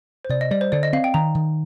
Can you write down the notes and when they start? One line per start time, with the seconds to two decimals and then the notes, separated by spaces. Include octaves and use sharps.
0.25 C5
0.29 C3 D5
0.41 D#5
0.51 G3 D5
0.61 C5
0.72 D3 D5
0.83 D#5
0.93 C4 F5
1.04 G5
1.14 D#3 A#5
1.35 D#3